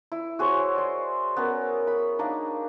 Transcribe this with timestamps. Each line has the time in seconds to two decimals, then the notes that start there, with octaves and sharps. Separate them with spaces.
0.12 E4
0.39 F#4 G#4 C5 C#5
0.75 D5 C6
1.37 B3 C#4 A#4
1.87 B5
2.19 A#3 D4 D#4